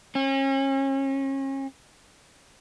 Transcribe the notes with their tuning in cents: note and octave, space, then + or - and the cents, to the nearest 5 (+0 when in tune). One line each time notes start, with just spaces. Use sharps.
C#4 -35